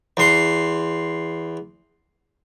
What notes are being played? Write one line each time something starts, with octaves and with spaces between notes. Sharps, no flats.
E2 C6